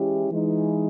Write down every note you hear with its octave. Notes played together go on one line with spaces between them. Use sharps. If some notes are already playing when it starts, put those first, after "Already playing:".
Already playing: E3 G#3 C#4 E4 G4
E3 G#3 D#4